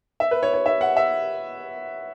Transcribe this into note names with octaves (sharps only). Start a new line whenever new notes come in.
E5
B4
C#5
C#5
E5
F#5
E5